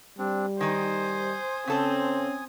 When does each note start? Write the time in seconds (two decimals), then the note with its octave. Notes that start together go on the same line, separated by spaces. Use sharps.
0.19 G3 C4 D4
0.60 D#3 D#4 C5 G#5 D#6
1.67 C#3 C4 C#4 A4 C5